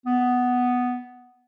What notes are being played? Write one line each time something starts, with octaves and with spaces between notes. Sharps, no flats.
B3